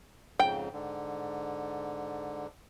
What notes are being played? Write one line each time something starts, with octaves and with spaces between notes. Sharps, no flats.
F2 G#2 C#3 G5
G#2 D3